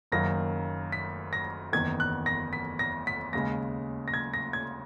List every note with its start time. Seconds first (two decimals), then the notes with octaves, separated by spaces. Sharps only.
0.12 F#1 F#2 D#3 A#3 A#6
0.92 B6
1.33 A#6
1.72 F#1 E2 D#3 G#6
2.00 F#6
2.26 A#6
2.53 B6
2.79 A#6
3.07 B6
3.33 D#2 C#3 G#3 A#6
4.08 A#6
4.14 G#6
4.34 A#6
4.53 G#6